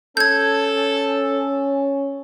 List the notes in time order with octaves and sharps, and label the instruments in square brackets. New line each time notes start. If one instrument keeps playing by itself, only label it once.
[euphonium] C#4 [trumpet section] A4 [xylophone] G6 G#6